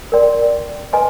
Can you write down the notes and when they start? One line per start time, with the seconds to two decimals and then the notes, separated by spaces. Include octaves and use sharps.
0.12 A#4 D5 G5 C6
0.93 B4 D#5 G#5 C6